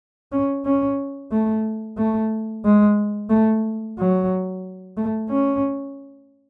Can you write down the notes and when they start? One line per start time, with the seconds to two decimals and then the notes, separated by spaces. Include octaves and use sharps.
0.32 C#4
0.65 C#4
1.31 A3
1.98 A3
2.65 G#3
3.30 A3
3.98 F#3
4.97 A3
5.30 C#4